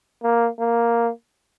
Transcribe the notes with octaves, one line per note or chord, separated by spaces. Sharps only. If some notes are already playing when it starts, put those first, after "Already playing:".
A#3
A#3